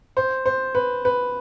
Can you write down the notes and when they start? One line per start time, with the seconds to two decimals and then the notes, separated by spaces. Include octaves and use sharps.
0.17 C5
0.46 C5
0.75 B4
1.05 B4